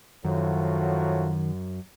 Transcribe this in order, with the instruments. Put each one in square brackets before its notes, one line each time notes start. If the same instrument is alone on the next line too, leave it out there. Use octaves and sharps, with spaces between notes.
[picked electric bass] F#2 [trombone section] A2 F3 F#3 [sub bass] D#3